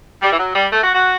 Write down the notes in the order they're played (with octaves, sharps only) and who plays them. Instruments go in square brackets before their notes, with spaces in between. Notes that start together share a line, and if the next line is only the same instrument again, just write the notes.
[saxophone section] G3
E3
F#3
G3
A3
F#4
F#4